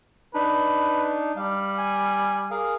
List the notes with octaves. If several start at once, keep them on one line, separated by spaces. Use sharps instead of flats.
D4 D#4 B4
G3 F5
G#5
G#4 A#4 F5